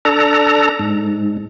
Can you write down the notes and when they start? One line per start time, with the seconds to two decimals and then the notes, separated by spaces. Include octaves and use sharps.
0.05 D4 A4 A#5
0.79 G#2